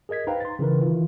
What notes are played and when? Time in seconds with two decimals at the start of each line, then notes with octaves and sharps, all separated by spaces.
0.09 G#4 A#4 D#5 G#6 B6
0.27 D#4 B4 C5 F5 G5 A#5
0.40 C6 A6
0.59 C#3 E3 D#4 A#4 B4
0.82 D#3 E3 F4